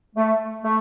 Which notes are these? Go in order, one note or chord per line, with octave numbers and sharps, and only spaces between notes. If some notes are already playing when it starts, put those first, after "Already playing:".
A3
A3